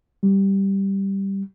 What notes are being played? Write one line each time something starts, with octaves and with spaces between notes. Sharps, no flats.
G3